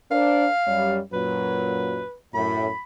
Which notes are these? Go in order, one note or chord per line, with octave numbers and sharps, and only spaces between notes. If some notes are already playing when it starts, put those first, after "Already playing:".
D4 A#4 C5 F5
F#2 G3 C#5
F#2 A#2 F#3 B4
F#2 A2 B5